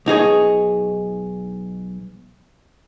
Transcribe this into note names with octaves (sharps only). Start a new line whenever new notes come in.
B1 D#4 G#4 C#5